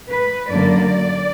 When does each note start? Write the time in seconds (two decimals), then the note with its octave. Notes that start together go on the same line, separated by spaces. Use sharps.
0.10 B4
0.48 F#2 D3 F#3 A#3 D5